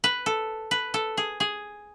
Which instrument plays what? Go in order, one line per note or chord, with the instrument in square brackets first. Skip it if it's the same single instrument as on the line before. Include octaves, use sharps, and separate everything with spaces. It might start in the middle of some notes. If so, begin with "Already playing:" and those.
[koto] B4
A4
B4
A4
G#4
G#4